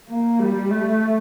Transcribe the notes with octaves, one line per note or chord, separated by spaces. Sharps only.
A#3
G3
A3